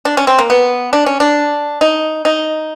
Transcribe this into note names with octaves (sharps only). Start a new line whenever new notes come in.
D4
C#4
C4
A#3
B3
D4
C#4
D4
D#4
D#4